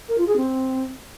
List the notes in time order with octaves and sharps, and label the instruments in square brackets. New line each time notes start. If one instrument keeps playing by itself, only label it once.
[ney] A#4
F4
G#4
C4